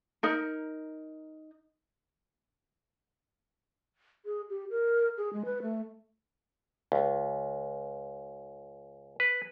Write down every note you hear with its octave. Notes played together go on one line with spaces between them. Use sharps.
D#4 A#4
G#4
G4
A#4
G#4
G#3
B4
A3
C#2
B4